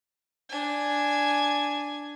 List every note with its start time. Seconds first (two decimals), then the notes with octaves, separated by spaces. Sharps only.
0.50 D4 G#5